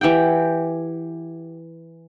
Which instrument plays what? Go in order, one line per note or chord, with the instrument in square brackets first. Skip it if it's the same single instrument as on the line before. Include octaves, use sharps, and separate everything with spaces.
[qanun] E3 G4 F#5 G5